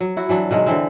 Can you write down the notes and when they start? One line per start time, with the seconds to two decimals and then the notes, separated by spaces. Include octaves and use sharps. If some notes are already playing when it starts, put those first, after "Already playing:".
0.01 F#3
0.17 E4 F#4
0.29 E3 F#3 D4
0.51 B2 D#3 F#3 G#3
0.66 D3 E3 C4